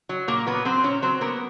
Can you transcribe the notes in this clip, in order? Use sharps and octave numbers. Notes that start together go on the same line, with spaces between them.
F#3
A#2 A#3 A#4
F#3 B3 B4
F#3 C4 C5
A#2 C#4 C#5
F#3 C4 C5
A#3 B3 A#4